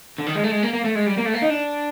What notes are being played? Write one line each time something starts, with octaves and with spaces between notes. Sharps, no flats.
D3
D#3
G#3
A3
G#3
A#3
A#3
A3
G#3
G3
A#3
A3
A#3
D#4
D4